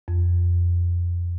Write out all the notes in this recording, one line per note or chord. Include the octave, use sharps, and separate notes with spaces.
F2